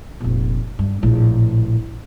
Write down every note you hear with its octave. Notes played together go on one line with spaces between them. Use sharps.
F1 A#1
G2
A#1 A2